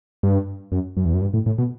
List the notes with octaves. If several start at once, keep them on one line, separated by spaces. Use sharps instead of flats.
G2
F#2
F#2
E2
F#2
G2
A2
A2
B2